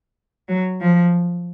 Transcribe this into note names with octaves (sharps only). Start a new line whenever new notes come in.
F#3
F3